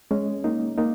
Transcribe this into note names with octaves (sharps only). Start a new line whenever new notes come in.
G#3 C#4
A#3 D#4
A#3 D#4